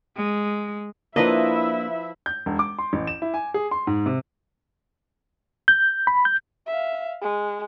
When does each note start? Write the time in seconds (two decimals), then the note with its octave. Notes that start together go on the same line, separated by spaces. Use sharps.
0.17 G#3
1.16 F3 A#3 D4 E4 B4 D#5 E5
2.26 G6
2.46 E1
2.59 D6
2.79 C6
2.93 A1
3.07 E7
3.22 E4
3.34 G#5
3.54 G#4
3.71 C6
3.87 G#2
4.06 C3
5.68 G6
6.07 B5
6.25 G6
6.67 E5 F5
7.22 G#3